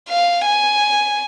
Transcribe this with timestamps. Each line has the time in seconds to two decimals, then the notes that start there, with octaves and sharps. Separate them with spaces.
0.09 F5
0.45 G#5